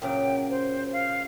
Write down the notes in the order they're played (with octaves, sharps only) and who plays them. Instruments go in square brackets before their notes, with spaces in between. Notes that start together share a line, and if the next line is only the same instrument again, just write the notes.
[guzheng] A#2 C#3 F#3 [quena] G5
[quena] C5
F5